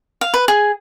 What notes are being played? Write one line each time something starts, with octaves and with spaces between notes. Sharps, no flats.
F5
B4
G#4